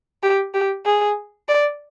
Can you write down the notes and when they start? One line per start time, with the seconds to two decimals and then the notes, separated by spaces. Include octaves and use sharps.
0.23 G4
0.54 G4
0.85 G#4
1.49 D5